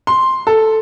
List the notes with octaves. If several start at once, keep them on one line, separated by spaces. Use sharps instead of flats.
C6
A4